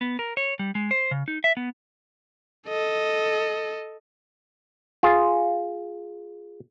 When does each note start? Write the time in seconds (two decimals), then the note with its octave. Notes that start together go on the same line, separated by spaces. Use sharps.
0.01 B3
0.19 A#4
0.37 C#5
0.59 G3
0.75 G#3
0.91 C5
1.11 C#3
1.28 D#4
1.44 E5
1.57 B3
2.68 A4 D#5
5.03 F4 G#4